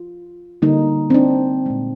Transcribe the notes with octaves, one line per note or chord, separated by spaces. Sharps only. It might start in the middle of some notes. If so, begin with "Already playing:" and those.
Already playing: F4
D3 G3 A#3 D#4
C4
D4
A#2 G#3